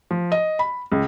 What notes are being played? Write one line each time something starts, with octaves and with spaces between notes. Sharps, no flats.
F3
D#5
B5
C#2